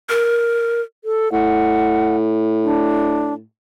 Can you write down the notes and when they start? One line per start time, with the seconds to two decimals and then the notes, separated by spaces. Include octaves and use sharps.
0.09 A#4
1.04 A4
1.32 A2 F#5
2.64 D4